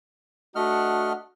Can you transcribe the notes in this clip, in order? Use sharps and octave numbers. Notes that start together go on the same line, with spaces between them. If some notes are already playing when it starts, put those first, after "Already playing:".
A3 D4 F#4 D#5 F#5 F6